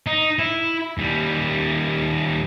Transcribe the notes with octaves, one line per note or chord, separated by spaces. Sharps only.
D#4
E4
D#2 G3